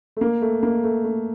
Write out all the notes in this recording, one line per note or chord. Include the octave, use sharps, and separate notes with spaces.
A3
A#3
A3
A#3
A3
A3